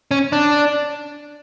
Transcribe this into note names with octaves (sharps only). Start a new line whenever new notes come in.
C#4
D4